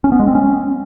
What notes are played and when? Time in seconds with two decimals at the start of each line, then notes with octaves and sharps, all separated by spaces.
0.04 C#4
0.12 B3
0.20 G#3
0.27 C4
0.35 C#4